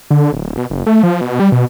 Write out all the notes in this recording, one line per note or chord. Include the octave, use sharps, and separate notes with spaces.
D3
D1
B2
F#1
A3
F3
B2
G3
B2